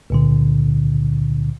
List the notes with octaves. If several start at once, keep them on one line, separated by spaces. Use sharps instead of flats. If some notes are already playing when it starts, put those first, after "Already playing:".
C#2 A#2 D3